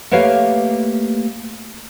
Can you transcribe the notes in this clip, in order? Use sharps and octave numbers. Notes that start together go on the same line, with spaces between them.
A3 A#3 G4 B4 C#5 F5